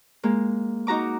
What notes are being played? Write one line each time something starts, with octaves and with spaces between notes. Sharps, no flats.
G#3 A#3
D#4 F#4 A#5 D6